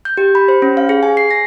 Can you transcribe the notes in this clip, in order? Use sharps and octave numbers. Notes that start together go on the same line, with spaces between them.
G6
G4
B5
C5
C#4
F5
G#4
G#5
C7
A#6